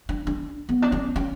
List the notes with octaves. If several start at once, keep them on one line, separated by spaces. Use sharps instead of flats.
D4
D4
B3
D4
C#4
C#4